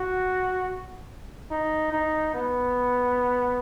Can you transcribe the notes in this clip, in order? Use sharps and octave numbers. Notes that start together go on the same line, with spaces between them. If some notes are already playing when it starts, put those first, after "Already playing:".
Already playing: F#4
D#4
D#4
B3